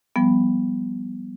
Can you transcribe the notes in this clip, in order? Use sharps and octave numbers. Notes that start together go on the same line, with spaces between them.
F3 G3 B3